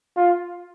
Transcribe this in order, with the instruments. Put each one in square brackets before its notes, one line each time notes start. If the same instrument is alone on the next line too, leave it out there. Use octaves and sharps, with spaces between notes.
[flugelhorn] F4